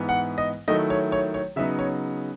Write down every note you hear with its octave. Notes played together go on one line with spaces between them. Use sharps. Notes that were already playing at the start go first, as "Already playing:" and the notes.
Already playing: G#2 E3 B3
F#5
D#5
D#3 F#3 A3 E4 D#5
C#5
C#5
C#5
C#3 F#3 B3 D#4 E5
C#5